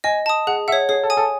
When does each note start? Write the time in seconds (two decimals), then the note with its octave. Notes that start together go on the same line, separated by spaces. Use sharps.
0.04 D#5 G#5
0.26 A5 D#6
0.47 G#4 F#5
0.68 E5 F#5
0.72 C#5
0.89 G#4 C#5
1.03 A4
1.10 G#5 D#6
1.17 A4